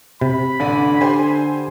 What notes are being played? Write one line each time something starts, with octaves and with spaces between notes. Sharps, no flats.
C3 B5
A1 D3 D5 D#7
G4 C5 G#5